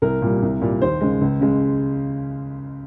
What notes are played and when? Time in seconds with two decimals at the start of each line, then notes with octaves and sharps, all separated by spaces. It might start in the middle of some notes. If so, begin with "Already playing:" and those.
0.02 C2 A#4
0.22 A#2 G3
0.42 C2
0.61 A#2 G3
0.82 D#2 C5
1.01 C#3 G#3
1.21 C#2
1.41 C#3 G#3